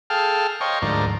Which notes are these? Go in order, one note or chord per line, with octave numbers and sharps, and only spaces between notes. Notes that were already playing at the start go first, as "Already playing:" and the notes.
G#4 A4 F5 G5 A5 F6
C5 C#5 D#5 F5 G5 C#6
D2 G#2 F3 A#4 D5